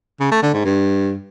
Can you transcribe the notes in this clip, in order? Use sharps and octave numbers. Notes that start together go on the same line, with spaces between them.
C#3
A3
D3
G#2
G2